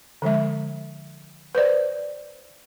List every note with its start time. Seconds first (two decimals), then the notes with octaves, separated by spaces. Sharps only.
0.22 D3 F3 G#3 E5
1.55 B4 C5 D5